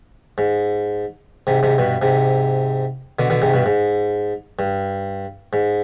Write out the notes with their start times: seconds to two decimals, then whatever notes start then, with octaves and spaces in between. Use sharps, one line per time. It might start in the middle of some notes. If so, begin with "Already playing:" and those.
0.38 G#2
1.47 G#2 C3
1.63 G#2 C3
1.78 G2 B2
2.02 G#2 C3
3.19 B2 D3
3.30 B2 D3
3.42 G#2 C3
3.54 G2 B2
3.66 G#2
4.59 G2
5.53 G#2